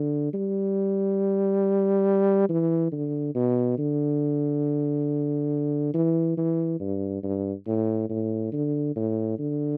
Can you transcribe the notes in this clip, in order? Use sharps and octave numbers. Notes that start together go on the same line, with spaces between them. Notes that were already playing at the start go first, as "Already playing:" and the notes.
Already playing: D3
G3
E3
D3
B2
D3
E3
E3
G2
G2
A2
A2
D3
A2
D3